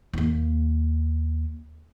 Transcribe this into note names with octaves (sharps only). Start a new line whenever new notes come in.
D#2 A#3